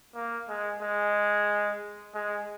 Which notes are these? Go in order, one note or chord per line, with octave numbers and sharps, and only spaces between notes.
A#3
G#3
G#3
G#3